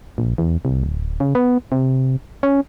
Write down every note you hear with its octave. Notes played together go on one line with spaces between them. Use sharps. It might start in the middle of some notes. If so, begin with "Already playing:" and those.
A#1
E2
C2
D1
C#3
B3
C3
C#4